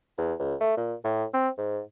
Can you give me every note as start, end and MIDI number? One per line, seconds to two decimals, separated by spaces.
0.18 0.34 40
0.39 0.55 37
0.61 0.75 57
0.77 0.94 46
1.04 1.25 45
1.34 1.49 60
1.58 1.80 44